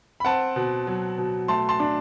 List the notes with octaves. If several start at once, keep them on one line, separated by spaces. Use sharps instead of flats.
B5
C4 F#5 A5
B2
F#3
B2
A3 A5 C6
A5 C6
D4